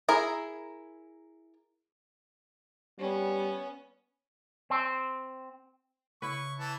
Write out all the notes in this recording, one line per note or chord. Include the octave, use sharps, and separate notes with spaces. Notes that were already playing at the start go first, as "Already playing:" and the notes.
E4 G#4 A#4
G3 B3 C#4
C4
C#3 E4 B4 C#6
E3 A5